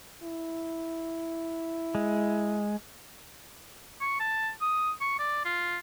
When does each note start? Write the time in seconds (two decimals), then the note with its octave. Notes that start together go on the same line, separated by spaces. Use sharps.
0.23 E4
1.95 G#3
4.01 C#6
4.20 A5
4.62 D#6
5.01 C#6
5.19 D5
5.45 F4